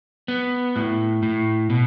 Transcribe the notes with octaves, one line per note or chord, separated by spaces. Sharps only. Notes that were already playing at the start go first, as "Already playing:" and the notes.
B3
A2
A2
B2